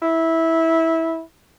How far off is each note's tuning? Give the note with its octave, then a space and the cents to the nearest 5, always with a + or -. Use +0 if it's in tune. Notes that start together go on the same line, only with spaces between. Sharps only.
E4 -15